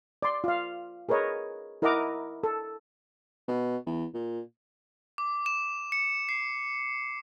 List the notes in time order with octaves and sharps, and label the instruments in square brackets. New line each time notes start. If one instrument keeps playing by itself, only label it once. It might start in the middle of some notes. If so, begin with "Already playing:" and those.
[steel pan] D5 C6
F4 F5
G#4 A#4 B4 C#5 D#5
E4 A#4 D#5 F#5 A#5 D6
A4
[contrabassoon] B2
E2
A#2
[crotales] D6
E7
C#7
C7